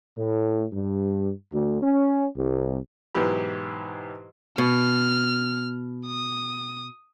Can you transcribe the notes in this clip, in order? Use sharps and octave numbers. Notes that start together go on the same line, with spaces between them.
A2
G2
D2
C#4
C2
G#2 B2 E3 F#3 G4 B5
B2 F6
D#6